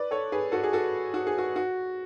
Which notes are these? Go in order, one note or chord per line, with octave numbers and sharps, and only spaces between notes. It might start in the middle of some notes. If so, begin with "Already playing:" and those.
Already playing: B4 D5
A4 C#5
G#4 B4
F#4 A4
G#4
F#4 A4
F#4
G#4
F#4
F#4